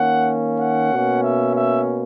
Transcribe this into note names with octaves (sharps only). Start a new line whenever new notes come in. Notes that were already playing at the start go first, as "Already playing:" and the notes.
Already playing: D#3 A#3 C#4 F#5
F#5
B2 A#3 C#4
E5
E5